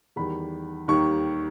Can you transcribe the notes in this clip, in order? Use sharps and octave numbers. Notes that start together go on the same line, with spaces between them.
E2 D#3 G3 B5
D#2 D#3 G3 C#6